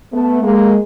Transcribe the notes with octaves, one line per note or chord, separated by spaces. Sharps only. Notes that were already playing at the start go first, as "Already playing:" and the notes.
A3 B3
G#3 A#3